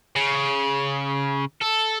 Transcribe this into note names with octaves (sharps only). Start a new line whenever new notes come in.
C#3
A4